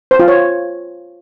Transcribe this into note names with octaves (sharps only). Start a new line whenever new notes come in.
C5
F4
C#5